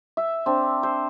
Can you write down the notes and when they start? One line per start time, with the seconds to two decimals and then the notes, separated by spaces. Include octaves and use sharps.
0.17 E5
0.46 C4 D4
0.83 C5